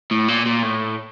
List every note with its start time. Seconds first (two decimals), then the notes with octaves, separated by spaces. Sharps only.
0.11 A2
0.29 A#2
0.46 A#2
0.64 A2